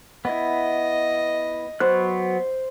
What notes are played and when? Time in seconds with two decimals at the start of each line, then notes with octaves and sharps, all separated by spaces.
0.25 B3 E4 D#5
1.80 F#3 B3 C5 F#6